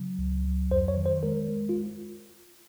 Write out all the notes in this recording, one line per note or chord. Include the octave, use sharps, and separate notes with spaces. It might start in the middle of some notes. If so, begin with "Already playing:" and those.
Already playing: C#3 F#3
C#2
F#3
F2 C5
C#5
D#3
C5
G#3 A#4
G#3
F4